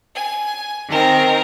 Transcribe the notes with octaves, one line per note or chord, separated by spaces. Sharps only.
G#5
D#3 C4 A#4